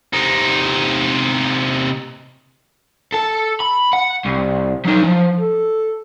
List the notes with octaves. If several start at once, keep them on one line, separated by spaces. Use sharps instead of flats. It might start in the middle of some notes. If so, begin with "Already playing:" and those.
C3 D#4
A4 A5
B5
F#5
C2
F#3 D#4
F3
A4